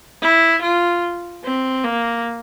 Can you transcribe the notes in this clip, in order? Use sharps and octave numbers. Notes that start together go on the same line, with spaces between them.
E4
F4
C4
A#3